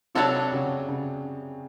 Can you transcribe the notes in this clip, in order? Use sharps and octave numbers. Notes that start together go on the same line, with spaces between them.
C3 F#3 A3 D4 F#4 A4
C#3
C#3